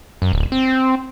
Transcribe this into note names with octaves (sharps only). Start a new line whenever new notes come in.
F#2
D1
C4